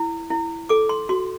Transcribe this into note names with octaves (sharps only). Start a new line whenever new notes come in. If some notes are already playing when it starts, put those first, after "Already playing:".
Already playing: E4
E4
A4 D6
C6
F#4 C6